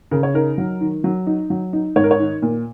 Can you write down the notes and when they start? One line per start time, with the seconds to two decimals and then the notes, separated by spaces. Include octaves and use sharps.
0.11 C#3 A#4
0.23 C#5
0.34 D#4 A#4
0.58 F#3
0.81 D#3
1.04 F#3
1.27 D#4
1.50 F#3
1.73 D#4
1.96 G#2 C#5
2.04 A#4
2.11 C#5
2.20 D#3
2.42 A#2